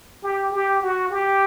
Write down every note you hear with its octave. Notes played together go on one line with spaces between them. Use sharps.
G4
G4
F#4
G4